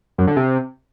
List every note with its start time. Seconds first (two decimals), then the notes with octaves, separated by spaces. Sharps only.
0.18 F#2
0.27 D3
0.36 C3